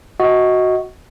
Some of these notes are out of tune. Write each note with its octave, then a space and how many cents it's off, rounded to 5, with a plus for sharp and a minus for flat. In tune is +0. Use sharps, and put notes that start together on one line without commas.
F#4 +0 D#5 +20